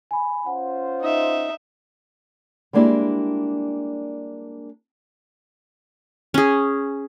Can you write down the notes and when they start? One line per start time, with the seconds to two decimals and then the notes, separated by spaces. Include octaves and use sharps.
0.11 G#5 B5
0.46 C#4 F4 C5 F#5
1.01 D#4 E5
2.73 G3 G#3 A#3 D4 E4 G4
6.34 C#4 G#4